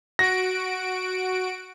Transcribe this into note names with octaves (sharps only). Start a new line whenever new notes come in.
F#4 A#6 D7